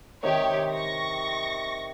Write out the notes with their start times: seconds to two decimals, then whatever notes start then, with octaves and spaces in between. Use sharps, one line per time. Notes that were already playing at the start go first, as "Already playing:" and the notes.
0.23 C3 D#3 G4 C#5
0.72 C#6 A#6